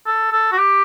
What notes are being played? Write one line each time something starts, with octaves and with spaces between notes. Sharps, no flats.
A4
A4
F#4
G4